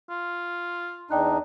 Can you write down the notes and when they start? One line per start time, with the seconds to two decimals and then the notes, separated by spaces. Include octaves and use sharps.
0.10 F4
1.11 E2 D4 D#4 D5 G5 F#6